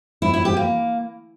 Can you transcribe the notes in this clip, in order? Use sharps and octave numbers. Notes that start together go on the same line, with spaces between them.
E4
E4
G4
A#3